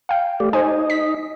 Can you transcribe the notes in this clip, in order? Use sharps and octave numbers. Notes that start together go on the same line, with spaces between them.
F5 G5
A3 G4 D5
D#4 C5 D#5 G#5
B6